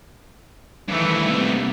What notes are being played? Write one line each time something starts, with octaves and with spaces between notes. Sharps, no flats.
G2 D#3 E3 A3
C3 A#3 B3